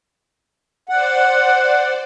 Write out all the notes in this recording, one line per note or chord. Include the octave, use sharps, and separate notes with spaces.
C5 D5 F#5